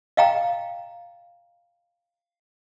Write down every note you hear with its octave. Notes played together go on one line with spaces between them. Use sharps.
D#5 F5 G5 A#5